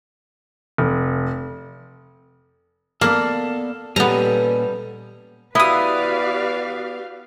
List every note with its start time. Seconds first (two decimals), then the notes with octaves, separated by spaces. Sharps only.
0.78 F1
3.01 A#3 B3 A4 D5 F5
3.96 A#2 G3 B3 C#4 G4 A4 B4 A#5
5.55 B3 E4 F#4 G4 B4 D5 F5 D#6